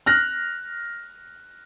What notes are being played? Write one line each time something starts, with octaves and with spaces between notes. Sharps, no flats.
F6 F#6 A#6